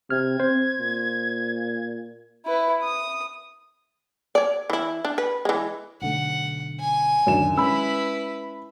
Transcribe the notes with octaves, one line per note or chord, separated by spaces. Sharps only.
C3 F6 G#6
C4 C5
A#2
E4 B4
D#6
C#5 D5
E3 E4
D4
B4
E3 G#3
B1 D3 A3 F#5
G#5
D1 F#2 D#3 D4 E7
G#3 C#4 E4 B4 B5 E6